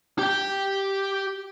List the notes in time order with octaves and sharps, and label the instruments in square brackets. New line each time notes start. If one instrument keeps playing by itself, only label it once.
[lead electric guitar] G4 G5